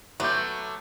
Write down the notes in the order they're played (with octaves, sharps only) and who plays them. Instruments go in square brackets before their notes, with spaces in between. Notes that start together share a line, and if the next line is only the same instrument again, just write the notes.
[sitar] F#3 A3 [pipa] B3 [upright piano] C6 D6 G6